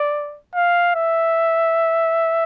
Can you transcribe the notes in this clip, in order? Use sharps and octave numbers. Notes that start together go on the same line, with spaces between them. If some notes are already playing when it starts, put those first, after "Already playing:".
Already playing: D5
F5
E5